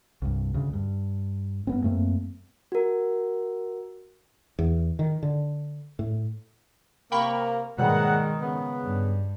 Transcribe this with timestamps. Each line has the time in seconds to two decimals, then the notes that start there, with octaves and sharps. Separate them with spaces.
0.22 C2 G2
0.54 D2 C#3
0.73 G2
1.67 G2 B3 C4
1.84 F#2 A3 A#3 C4
2.72 F#4 A#4
4.59 E2
4.99 D#3
5.23 D3
5.99 A2
7.12 C3 A#3 G5 B5 C#6
7.78 G#2 B2 D#3 F#3 G3 A#3 G#4 F#5
8.41 C#3 B3
8.84 G2